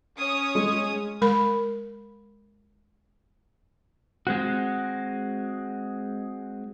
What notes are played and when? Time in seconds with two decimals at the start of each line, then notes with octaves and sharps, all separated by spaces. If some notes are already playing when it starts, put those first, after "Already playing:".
0.17 C#4 C#5 D#6
0.55 G#3
1.22 G#3 A#4 B5
4.27 G#3 C4 F#4